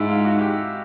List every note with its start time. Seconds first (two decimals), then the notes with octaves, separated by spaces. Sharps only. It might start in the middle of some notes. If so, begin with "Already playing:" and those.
Already playing: G#2 E4
0.09 F4
0.25 F#4
0.41 G4